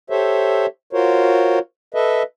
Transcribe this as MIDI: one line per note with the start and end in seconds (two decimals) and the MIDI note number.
0.10 0.66 67
0.10 0.66 69
0.10 0.66 72
0.10 0.66 73
0.10 0.66 76
0.93 1.59 65
0.93 1.59 66
0.93 1.59 70
0.93 1.59 72
0.93 1.59 73
1.94 2.23 69
1.94 2.23 71
1.94 2.23 75
1.94 2.23 76